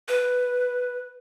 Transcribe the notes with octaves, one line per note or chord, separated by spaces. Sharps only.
B4